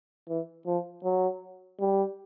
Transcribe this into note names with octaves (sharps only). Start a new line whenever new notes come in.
E3
F3
F#3
G3